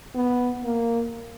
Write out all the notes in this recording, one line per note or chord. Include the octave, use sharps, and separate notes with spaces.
B3
A#3